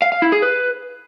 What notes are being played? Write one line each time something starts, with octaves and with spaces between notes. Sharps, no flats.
F5
F5
E4
G#4
B4